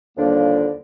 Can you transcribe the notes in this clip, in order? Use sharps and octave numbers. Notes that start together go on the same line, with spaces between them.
D#2 D3 F3 G3 A#3 D4